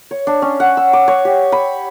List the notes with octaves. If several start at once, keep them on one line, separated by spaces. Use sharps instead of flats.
C#5
D4
C#4
F#5
E6
D6
C#5
G4
B5